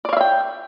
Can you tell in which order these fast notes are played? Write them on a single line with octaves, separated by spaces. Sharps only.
D5 C#5 F5 E5 G5